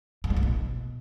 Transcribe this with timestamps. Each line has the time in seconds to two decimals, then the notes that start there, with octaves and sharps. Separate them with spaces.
0.24 G2
0.30 G#2
0.37 A#2
0.43 B2